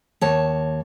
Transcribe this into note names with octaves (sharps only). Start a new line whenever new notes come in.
D#2 C#5 A5